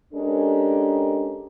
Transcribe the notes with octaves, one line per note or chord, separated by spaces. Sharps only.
G#3 C#4 D4 G4 A4 A#4